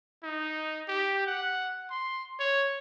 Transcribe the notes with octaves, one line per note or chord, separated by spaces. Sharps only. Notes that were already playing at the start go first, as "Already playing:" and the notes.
D#4
G4
F#5
C6
C#5